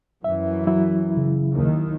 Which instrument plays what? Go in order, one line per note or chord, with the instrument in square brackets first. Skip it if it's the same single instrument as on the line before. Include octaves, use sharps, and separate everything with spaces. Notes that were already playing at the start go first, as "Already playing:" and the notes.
[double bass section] F#2 E3 [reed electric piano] E5
[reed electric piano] F#3 E4
[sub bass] C#3
[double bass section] D#2 D#3